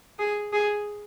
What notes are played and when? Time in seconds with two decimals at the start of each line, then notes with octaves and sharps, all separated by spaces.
0.19 G#4
0.53 G#4